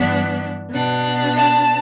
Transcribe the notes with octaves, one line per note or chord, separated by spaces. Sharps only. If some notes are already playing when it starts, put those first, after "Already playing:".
Already playing: G2 E3 B3 D4
B2 B3 D4
A5